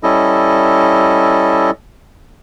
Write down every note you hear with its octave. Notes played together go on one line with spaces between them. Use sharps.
G3 C#4 E4 A4 D#5